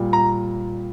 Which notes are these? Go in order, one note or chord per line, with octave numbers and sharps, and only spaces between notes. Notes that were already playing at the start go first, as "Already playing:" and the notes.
Already playing: A#2 G3
A#5